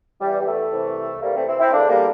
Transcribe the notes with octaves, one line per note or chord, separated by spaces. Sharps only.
E2 E3 G3
G3
A3
C2 C3 E3
D2 C3 E3 G3 A#3
A3 C4
C4 E4
C4 E4
E2 D3 A#3 D4
G3 A#3